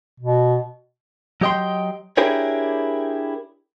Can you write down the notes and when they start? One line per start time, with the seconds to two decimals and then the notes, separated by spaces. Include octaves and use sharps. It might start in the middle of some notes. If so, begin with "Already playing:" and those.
0.20 B2
1.41 F#3 G4 D#5 G5 C6
2.17 D4 E4 G4 G#4 A#4 C#5